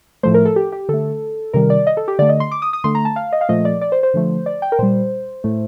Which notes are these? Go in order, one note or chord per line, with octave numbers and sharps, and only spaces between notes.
A2 F3 A3 C5
A#4
A4
G4
G4
D3 A3 A4
C3 D#3 G3 A#4
D5
D#5
A4
G4
D3 A3 D5
D#5
C6
D6
D#6
D#6
D3 A3 C6
A#5
A5
F5
D#5
F5
A#2 F3 A3 D#5
D5
D5
C5
C5
D3 F3 A3
D5
G5
A#4
A#2 G3 C5
A2 A3